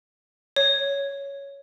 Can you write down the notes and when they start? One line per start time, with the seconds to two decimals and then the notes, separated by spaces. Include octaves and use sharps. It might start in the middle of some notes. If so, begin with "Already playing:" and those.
0.56 C#5